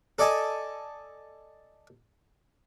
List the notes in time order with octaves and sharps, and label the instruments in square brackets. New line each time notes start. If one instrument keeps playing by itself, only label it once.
[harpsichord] A4 D5 D#5 G#5 A5